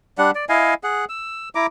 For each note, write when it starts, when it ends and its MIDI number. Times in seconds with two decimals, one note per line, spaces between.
0.18 0.31 55
0.18 0.31 62
0.18 0.31 78
0.35 0.45 74
0.49 0.74 64
0.49 0.74 75
0.49 0.74 77
0.49 0.74 80
0.83 1.05 68
0.83 1.05 78
1.09 1.49 88
1.55 1.66 64
1.55 1.66 82
1.55 1.66 86